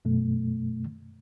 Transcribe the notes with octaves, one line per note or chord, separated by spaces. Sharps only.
F#2 B2 A3